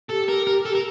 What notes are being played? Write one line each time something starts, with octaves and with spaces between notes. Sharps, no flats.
G4 A4
A#4
A#4
A4
A#4